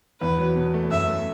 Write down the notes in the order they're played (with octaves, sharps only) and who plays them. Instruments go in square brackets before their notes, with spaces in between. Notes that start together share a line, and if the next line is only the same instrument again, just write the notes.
[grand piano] E2 [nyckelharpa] B4
[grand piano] F#3
B2
A3
[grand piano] F#2 [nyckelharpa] E5
[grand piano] A3